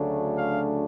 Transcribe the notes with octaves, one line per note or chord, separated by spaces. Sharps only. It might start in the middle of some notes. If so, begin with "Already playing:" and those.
Already playing: D2 C#3 F#3 A3 D4
F5